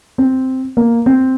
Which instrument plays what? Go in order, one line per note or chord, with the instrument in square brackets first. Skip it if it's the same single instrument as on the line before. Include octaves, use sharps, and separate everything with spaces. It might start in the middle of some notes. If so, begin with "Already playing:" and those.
[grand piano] C4
A#3
C4